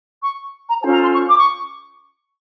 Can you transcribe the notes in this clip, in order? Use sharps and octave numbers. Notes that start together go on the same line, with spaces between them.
C#6
A#5
C#4 F4 A4 C5 A5
A#5
C6
C#6
D6
C#6